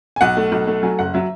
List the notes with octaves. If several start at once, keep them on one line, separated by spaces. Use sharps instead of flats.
G#5
B1 F#5
A3
B1
A3
F#3 G#5
F#1 F#5
F#3 E5